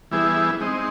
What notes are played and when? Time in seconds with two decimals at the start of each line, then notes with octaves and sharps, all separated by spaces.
0.11 E3 G3 B3 E4 G#4
0.60 G#3 C4 D#4